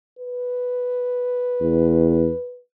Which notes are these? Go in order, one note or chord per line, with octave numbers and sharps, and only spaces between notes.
B4
E2